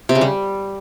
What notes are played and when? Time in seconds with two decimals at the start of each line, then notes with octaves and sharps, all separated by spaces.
0.09 C3
0.15 C#3
0.21 G3